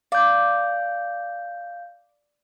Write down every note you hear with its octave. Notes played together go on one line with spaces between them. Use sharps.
D5 F5 G6